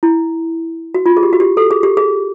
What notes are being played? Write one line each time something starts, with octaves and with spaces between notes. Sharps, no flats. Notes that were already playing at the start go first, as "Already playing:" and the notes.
E4
F#4
F4
G#4
G4
F#4
G4
A4
G#4
G4
G#4